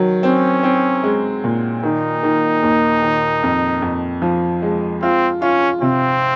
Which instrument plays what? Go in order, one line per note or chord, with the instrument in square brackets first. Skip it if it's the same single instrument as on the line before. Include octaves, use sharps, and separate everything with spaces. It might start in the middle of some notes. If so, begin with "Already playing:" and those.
Already playing: [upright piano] D#3 F#3
[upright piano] C4 [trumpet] C#4
[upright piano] C4
G#3
A#2
[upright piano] D#3 [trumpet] D#4
[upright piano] D#3
D#2
D#3
F2
F2
F3
G#3
[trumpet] C4 [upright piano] F4
[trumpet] C#4 [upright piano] F4
[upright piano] C3 [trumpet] C4